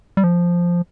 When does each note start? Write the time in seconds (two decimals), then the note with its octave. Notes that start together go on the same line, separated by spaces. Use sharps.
0.17 G3
0.24 F3